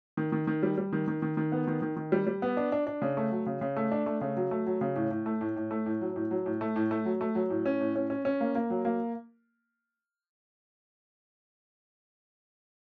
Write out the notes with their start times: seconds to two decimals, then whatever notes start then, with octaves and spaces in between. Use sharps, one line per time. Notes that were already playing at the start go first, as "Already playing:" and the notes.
0.17 D#3
0.32 D#3
0.47 D#3
0.63 G3
0.78 G3
0.93 D#3
1.08 D#3
1.22 D#3
1.37 D#3
1.52 B3
1.67 D#3
1.82 D#3
1.96 D#3
2.12 G3
2.27 G3
2.42 B3
2.57 D4
2.72 D4
2.87 D4
3.02 C#3
3.17 A3
3.32 F#3
3.47 C#3
3.61 C#3
3.76 A3
3.92 D4
4.06 A3
4.21 C#3
4.37 F#3
4.51 A3
4.66 F#3
4.81 C#3
4.96 A2
5.11 A2
5.26 A3
5.41 A2
5.56 A2
5.71 A3
5.86 A2
6.01 F#3
6.16 A2
6.31 F#3
6.46 A2
6.61 A3
6.76 A2
6.91 A3
7.05 F#3
7.21 A3
7.35 F#3
7.50 A2
7.66 C#4
7.80 A2
7.95 C#4
8.10 C#4
8.25 C#4
8.41 A#3
8.55 A#3
8.70 F#3
8.85 A#3